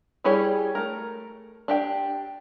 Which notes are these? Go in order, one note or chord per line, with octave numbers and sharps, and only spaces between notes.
G3 E4 G4 G#4 C#5
A3 A#4
D4 G4 G5